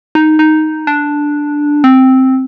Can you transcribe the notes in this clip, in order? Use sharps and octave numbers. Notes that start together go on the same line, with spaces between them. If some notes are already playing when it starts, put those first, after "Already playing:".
D#4
D#4
D4
C4